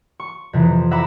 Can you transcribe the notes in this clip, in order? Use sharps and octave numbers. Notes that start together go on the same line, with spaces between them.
C#6
F2 C3 E3
E5 F#5 A#5 B5 D6